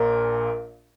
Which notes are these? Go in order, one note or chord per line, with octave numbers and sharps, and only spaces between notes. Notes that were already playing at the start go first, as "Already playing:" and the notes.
Already playing: A#1 A#2 A#4